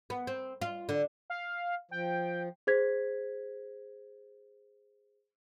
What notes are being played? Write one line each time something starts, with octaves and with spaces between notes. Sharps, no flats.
B3
C4
F4
D3
F5
F3 G5
G#4 C5 G#6 B6